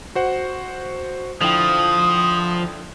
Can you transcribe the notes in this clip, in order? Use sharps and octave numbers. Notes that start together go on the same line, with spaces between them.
F#4 C5 F#5
D3 F3 E4 G5 D#6